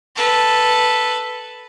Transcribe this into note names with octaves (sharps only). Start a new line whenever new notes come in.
A4 B4